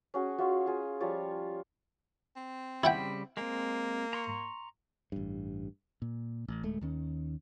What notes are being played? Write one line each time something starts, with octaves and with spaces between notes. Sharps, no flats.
C#4 F#4 G#4
F4 F#4 C#5 E5
F4 G#4
F3 G3 F4 C#5
C4
C#3 G3 E4 F#5 G5 B5
G#3 A#3 C4
A#5 C6 C#6
A1 G2
A#2
A1
D1 G#3 A3
D#2 D#3 C#4